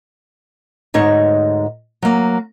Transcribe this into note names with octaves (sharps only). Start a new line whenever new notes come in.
D2 G#2 D#4 C#5
F#3 A#3